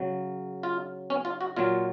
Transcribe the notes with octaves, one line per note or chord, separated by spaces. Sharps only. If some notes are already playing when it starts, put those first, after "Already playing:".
Already playing: C#3 F#3
F4
C#4
F4
F#4
A#2 F#3 F4